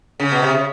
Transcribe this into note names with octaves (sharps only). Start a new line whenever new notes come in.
C#3
B2
C3
C#3